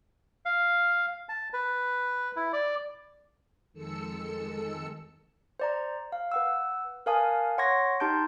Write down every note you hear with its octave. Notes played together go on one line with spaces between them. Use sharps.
F5
A5
B4
E4
D5
F2 D#3 G#3 A4 E6 C#7
C5 D5 A#5
F5
B4 F#5 E6
A#4 B4 F5 G#5 A5 D#6
C#5 F#5 C6 C#6 G#6 A#6
D#4 G4 A5 C6 G6 D7